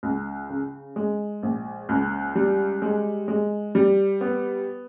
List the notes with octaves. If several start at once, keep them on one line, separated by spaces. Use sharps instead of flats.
C#2
C#3
G#3
A#1
C#2
G3
G#3
G#3
G3
B3